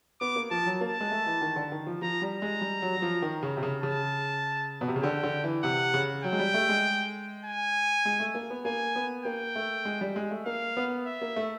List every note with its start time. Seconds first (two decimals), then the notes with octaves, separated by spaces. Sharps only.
0.21 B3 D6
0.36 A#3
0.51 F3 A5
0.66 F#3
0.81 A#3 A5
1.00 G#3
1.11 A3
1.26 E3
1.42 D#3
1.56 D3
1.72 D#3
1.87 F3
2.02 F3 A#5
2.22 G3
2.32 A#5
2.42 G#3
2.61 G3
2.82 F#3
2.97 F#3
3.02 F3
3.22 D#3
3.43 C#3
3.57 C3
3.63 C#3
3.83 C#3 A5
4.81 B2
4.88 C3
4.96 C#3
5.03 D3 G5
5.23 D3
5.44 E3
5.63 C3 F#5
5.94 C#3
6.24 F#3 G5
6.32 G#3
6.39 G3
6.54 A3
6.69 G#3
7.45 G#5
8.05 G#3
8.20 A3
8.35 A#3
8.50 B3
8.65 A#3 G#5
8.95 B3
9.25 A#3 G5
9.55 A3
9.85 G#3
10.01 G3
10.16 G#3
10.31 A3
10.46 A#3 F5
10.77 B3
11.06 E5
11.21 A#3
11.36 A3